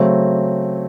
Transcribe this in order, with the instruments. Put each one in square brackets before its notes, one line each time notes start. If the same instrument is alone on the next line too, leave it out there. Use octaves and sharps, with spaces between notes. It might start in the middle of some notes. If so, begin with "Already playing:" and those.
Already playing: [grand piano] C#3 F#3 A3 C4